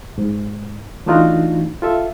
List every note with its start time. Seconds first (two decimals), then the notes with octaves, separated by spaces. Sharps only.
0.18 G#2
1.06 E3 A3 D4 D#4 F4 F#4
1.82 F4 A4 E5